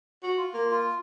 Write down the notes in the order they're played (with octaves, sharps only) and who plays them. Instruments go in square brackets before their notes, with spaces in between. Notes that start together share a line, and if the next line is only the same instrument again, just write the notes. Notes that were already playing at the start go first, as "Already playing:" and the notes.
[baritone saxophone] F#4
[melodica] F4
[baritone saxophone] A#3
[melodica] F4